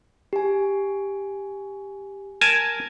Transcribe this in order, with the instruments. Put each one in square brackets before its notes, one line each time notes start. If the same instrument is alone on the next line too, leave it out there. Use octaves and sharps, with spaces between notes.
[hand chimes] G4 G#5
[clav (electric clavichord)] A#4 G#5 A5 [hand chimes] G#6